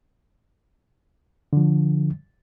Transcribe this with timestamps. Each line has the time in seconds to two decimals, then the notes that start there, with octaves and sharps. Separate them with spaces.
1.53 D3 F3